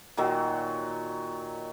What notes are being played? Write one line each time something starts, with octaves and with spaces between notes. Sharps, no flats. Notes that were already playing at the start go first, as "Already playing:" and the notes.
A#2 D#3 F#3